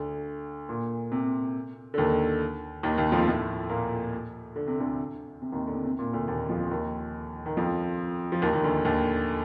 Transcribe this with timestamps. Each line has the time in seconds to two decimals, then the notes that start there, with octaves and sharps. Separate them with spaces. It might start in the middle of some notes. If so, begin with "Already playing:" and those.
Already playing: D2 D3
0.69 A#2
1.12 C3
1.94 D3
1.98 D#2 D#3
2.83 D#2 D#3
2.98 D#2 D#3
3.12 F2 F3
3.26 A2 A3
3.69 A#2 A#3
4.56 D3
4.67 C3
4.80 D2 D3
5.42 C3
5.52 D#2 D#3
5.67 D3
5.74 C3
5.85 C3
5.99 A#2
6.13 D2 D3
6.28 D#2 D#3
6.49 F2 F3
6.71 D#2 D#3
7.46 D#3
7.57 F2 F3
8.32 F3
8.42 D#2 D#3
8.53 D#2 D#3
8.64 D2 D3
8.85 D#2 D#3